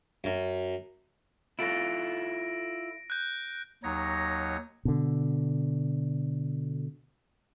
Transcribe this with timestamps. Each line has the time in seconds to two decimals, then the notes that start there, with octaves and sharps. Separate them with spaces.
0.24 F#2
1.59 E4 F4 A4 A#6 D7
3.10 F#6 G6
3.84 D#2 F#3 D#4 C#5 A#6
4.85 B2 D3